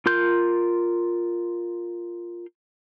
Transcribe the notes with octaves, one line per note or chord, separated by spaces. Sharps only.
F4 A#4 C6 G6